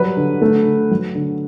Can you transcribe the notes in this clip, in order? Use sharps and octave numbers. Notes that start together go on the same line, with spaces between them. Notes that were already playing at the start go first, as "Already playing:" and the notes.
Already playing: F#3 G3 B4
D3
A3
D3
F#3
D3